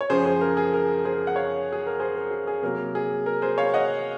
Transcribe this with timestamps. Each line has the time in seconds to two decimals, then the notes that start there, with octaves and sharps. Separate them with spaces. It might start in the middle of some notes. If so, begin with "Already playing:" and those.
0.01 C#5
0.10 F#2 C#3 F3 G#4 C5
0.25 G#4 C5
0.41 A#4
0.57 G#4
0.73 A#4
1.05 G#4 C5
1.27 F#5
1.36 C#5 F5
1.72 G#4
1.87 A#4
1.99 G#4 C5
2.16 A#4
2.31 G#4
2.47 G#4
2.62 C3 F#3 A#3 A#4
2.95 G#4
3.26 A#4
3.42 G#4 C5
3.58 C#5 F5
3.74 D#5 F#5